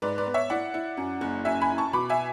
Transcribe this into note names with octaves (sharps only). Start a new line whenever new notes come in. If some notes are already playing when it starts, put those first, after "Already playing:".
G#2 B4 D5
B4 D5
B3
C#5 E5
E4 D5 F#5
E4
F#2
F#1
F#2 E5 G#5
G#5 B5
E4
A5 C#6
B2 B5 D6
E5 G#5